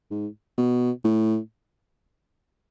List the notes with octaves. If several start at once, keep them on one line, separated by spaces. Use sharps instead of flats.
G#2
B2
A2